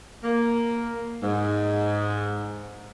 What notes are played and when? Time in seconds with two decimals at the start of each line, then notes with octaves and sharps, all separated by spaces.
0.24 A#3
1.23 G#2